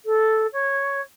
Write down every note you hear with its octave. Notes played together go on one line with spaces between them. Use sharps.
A4
C#5